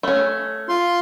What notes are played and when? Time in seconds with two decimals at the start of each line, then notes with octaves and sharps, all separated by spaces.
0.03 A3 C#4
0.69 F4 C6